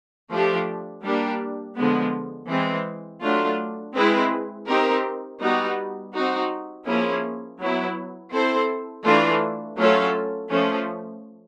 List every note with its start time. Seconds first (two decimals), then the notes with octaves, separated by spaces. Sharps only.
0.31 F3 A3 D4 G4
1.03 G3 A#3 D4 G4
1.76 D3 F3 G#3 B3
2.49 E3 G#3 C4
3.23 F#3 A3 D4 F4
3.95 G#3 C4 E4 G#4 B4
4.67 C4 D#4 G4 A#4
5.40 G3 B3 D#4 F#4
6.14 C4 D#4 F#4
6.86 F3 A#3 C#4 E4 G#4
7.59 F#3 B3 E4
8.32 C4 E4 A4 C5
9.04 E3 A3 D4 F4
9.77 F#3 A3 C#4 F4 A4
10.50 F3 A3 C#4